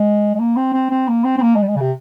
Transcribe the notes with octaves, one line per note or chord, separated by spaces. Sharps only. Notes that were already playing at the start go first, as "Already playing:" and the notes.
Already playing: G#3
G#3
A#3
C4
C4
C4
A#3
C4
C4
A#3
G#3
G3
G#3
C#3
C3